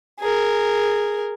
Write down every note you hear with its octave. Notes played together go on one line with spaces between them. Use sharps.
G#4 A#4